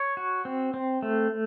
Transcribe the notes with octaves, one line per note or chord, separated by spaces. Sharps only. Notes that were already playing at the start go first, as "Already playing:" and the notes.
Already playing: C#5
F#4
C4
C4
A3